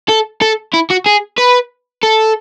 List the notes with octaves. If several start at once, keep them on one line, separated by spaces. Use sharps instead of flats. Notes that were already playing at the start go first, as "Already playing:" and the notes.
A4
A4
E4
F#4
G#4
B4
A4